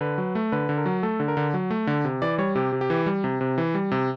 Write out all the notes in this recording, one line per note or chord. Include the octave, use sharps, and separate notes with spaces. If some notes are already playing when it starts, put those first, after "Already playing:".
D3 B4
F#3
A3
D3 B4
D3
A#4
F#3
A3 A4
D3
A#4
D3
F#3
A3
D3
C3
E3 D5
G3 C#5
C3 G4
C3
G4
E3
G3
C3
C3
E3
G3
C3